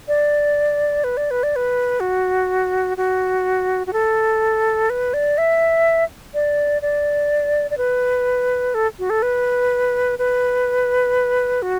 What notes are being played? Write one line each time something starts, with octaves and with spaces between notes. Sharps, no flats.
D5
B4
D5
B4
D5
B4
F#4
F#4
F#4
A4
B4
D5
E5
D5
D5
D5
B4
A4
F#4
A4
B4
B4
F#4